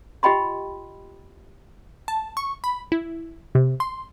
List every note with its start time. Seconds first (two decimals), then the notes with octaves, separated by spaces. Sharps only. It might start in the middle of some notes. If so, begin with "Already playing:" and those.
0.23 F4 G4 D#5 G5 B5 C6
2.08 A5
2.37 C#6
2.64 B5
2.92 E4
3.55 C3
3.80 C6